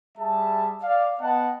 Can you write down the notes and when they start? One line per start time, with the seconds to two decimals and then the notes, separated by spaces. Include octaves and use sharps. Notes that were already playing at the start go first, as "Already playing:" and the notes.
0.18 G3 G#4 E5 A5
0.83 D5 F5
1.20 B3 D#5 F#5 G5 A5